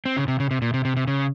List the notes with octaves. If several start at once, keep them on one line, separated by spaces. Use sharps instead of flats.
C4
C#3
C3
C#3
C3
A#2
C3
C3
C3
C#3